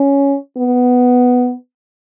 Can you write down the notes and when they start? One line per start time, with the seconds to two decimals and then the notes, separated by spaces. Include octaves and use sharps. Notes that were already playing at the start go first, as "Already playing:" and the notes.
Already playing: C#4
0.57 B3